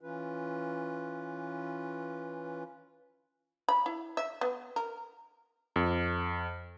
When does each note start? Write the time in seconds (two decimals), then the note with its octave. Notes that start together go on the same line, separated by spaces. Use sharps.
0.01 E3 C#4 F4 B4
3.68 B5
3.86 E4
4.17 E5
4.41 B3
4.76 A#4
5.76 F2